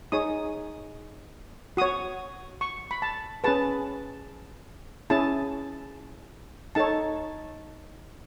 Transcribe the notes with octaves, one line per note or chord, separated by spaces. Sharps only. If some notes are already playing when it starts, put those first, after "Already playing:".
D#4 G#4 C#5 D#6
F#4 C#5 D#6
C#6
B5
A5
C#4 G#4 B4 A5
C#4 E4 G#4 A5
D#4 A4 C#5 A5